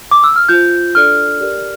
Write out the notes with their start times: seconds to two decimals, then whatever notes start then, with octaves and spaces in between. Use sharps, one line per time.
0.11 D6
0.24 E6
0.36 F6
0.49 F4 C5 G6
0.95 D4 A4 D5 F6
1.41 G4 A#4 D5